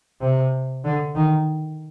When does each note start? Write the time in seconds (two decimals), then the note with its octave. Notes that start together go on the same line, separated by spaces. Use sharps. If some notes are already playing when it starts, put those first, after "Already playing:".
0.21 C3
0.84 D3
1.15 D#3